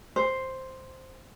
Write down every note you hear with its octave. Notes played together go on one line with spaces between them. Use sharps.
C5